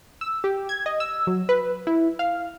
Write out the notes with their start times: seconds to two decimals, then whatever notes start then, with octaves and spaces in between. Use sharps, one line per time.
0.21 E6
0.44 G4
0.69 G#6
0.86 D#5
1.00 E6
1.27 F#3
1.49 B4
1.87 E4
2.19 F5